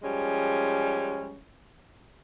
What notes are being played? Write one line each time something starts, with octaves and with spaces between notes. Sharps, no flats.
F3 G3 G#3 C#4